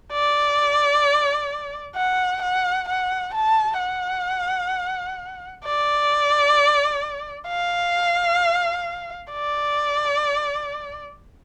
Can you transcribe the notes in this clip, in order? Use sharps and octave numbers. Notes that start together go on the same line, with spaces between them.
D5
F#5
F#5
F#5
A5
F#5
D5
F5
D5